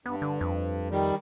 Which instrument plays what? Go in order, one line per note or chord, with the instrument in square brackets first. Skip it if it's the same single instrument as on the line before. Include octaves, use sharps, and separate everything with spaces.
[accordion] G2 [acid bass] B3
[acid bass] D3
F2
[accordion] D#3 G3